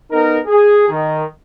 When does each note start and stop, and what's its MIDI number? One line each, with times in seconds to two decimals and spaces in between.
0.12 0.39 59
0.12 0.39 63
0.12 0.39 70
0.47 0.86 68
0.89 1.23 51